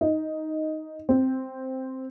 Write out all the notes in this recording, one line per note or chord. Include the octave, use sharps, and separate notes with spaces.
D#4
C4